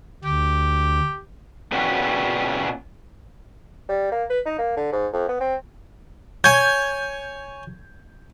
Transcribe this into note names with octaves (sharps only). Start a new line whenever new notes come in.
D2 G4
A#2 C#3 B3 C#4 F#4 G4
G3
A#3
B4
D#4
A#3
D3
G#2
F2
B3
C4
C#5 G#5 G6 G#6